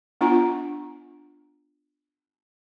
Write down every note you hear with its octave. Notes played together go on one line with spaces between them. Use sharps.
B3 D4 F4 G#5 A#5